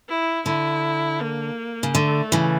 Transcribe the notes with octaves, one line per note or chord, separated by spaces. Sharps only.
E4
D3 E4
A#3
C#3
D3 A3
C#3 E3